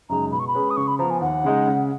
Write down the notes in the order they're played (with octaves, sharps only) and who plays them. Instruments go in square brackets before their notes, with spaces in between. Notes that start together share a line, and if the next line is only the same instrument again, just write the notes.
[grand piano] F#2 C#3 G#3 D#4 [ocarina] A#5
[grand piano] B2 [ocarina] B5
[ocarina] C#6
B5
[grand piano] G#3 C#4 G#4 B4
[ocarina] D#6
[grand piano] C#3 [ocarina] C#6
[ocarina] B5
[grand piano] F3 [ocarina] A#5
[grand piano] B3
[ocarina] G#5
[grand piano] D#2 [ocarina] F#5
[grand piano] C#3 G#3 D#4
C#3